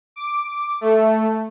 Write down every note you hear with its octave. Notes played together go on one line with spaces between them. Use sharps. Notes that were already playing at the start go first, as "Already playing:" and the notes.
D6
A3